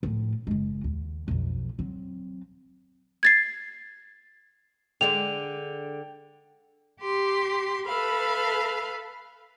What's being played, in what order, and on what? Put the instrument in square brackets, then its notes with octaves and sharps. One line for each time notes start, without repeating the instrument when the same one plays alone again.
[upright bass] A2 F3
F#1 G#3
D#2
B1 F2
F#3 C4
[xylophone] G#6 A6 C7
[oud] D3 G#3 D4 [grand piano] G5 [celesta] F7
[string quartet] G4 C6
A4 B4 E5 F5 B5